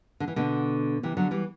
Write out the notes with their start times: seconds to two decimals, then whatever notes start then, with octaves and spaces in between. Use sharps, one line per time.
0.20 D3
0.28 E3
0.36 B2 D3
1.03 C3 E3
1.17 D3 F#3
1.31 E3 G3